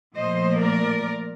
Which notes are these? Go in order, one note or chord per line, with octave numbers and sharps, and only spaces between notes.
A#2 F3 A3 C5 D#5
A#4 D5